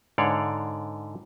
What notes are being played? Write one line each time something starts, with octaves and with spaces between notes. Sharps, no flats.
G#2 D3 C#5 D5 F5